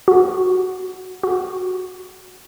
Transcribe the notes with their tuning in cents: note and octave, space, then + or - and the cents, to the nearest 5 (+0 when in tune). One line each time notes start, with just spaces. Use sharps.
F#4 +0
F#4 -10